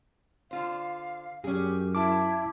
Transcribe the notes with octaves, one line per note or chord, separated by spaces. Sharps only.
D3 F4 C5 F5
F#2 C#4 G4 G#4
E4 A5 D6